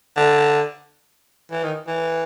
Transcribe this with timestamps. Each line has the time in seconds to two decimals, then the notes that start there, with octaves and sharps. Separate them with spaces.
0.17 D3
1.51 E3
1.64 D#3
1.87 E3